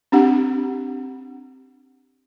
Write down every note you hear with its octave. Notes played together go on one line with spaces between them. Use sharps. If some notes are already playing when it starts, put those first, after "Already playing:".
C4 D4 G4 F#5